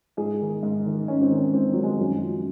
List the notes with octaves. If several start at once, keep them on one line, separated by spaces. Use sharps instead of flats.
G#2 G#4
D#3
G#2
D#3
G#2 C#4
C4
D#3
C#4
G#2 C4
D#3 F#3
G#3
F#2 F#3
F3